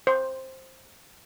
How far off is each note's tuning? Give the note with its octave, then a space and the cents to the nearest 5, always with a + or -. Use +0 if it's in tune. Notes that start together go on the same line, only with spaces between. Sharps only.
C5 +10